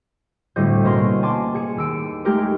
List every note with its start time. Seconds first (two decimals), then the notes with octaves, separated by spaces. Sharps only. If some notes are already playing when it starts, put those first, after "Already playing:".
0.56 D2 A2 G3 C4 D#5 G6
0.84 B2 A#3 C#4 A#4 D#5 C6
1.22 G#5 A5 C6 D6
1.54 G#4 G#5 C#7 E7
1.77 D#2 E6 D7 D#7
2.25 G#3 A3 D#4 G4 G#4 A#4